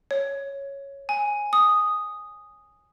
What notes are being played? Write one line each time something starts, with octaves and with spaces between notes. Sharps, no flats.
C#5
G#5
D#6